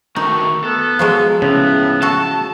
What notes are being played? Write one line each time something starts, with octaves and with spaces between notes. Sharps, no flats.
D#3 A3 D#4 F#4 C#6
B3 A4
F3 F#3 G#3
A2 C#3 B3
F#4 A4 A5